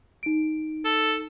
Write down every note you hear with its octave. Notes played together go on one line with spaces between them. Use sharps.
D#4 D7
A4